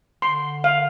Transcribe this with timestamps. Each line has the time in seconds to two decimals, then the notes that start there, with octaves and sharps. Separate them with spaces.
0.22 D3 C6
0.64 F5